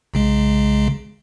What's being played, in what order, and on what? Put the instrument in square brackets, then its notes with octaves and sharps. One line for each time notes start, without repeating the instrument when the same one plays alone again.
[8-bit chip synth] B1 C#3 G#3